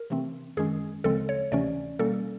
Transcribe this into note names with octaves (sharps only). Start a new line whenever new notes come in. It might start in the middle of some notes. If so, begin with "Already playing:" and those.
Already playing: A#4
C3 E3 A3 C4
F#2 D#3 G#3 C#4 G#4
D2 C#3 F3 G#3 C4 A4
C#5
D2 C3 E3 A3 C#4 D5
B2 G3 A#3 C#4 A4